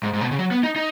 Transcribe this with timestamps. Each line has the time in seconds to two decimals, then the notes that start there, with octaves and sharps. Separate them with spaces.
0.03 G#2
0.13 G#2
0.21 B2
0.31 C#3
0.39 F#3
0.51 B3
0.63 D#4
0.76 D#4